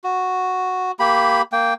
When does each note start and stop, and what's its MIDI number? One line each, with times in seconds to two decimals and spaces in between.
0.04 0.91 66
0.99 1.42 58
0.99 1.42 67
0.99 1.42 83
1.52 1.74 58
1.52 1.74 79